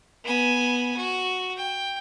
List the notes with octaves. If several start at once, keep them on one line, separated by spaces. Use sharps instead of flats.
B3 G#5
F#4
G5